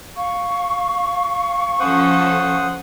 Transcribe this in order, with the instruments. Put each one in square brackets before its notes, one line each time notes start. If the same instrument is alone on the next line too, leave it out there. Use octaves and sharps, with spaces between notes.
[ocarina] F5 [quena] C#6
[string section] F3 C#4 A4 [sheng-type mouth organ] C5 F#5 D#6